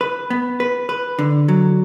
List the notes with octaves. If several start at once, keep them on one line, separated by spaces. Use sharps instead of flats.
B4
B3
B4
B4
D3
F#3